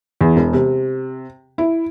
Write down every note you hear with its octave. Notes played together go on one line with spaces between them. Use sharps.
E2
E1
C3
E4